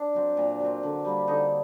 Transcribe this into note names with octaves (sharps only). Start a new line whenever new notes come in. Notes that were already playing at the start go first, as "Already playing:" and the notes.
Already playing: D4
F#3 C4
A#2
F#3 C4
D3
G3 A#3
D3 D#4